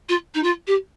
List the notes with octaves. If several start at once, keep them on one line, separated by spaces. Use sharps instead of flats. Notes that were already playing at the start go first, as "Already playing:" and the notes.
F4
D#4
F4
G4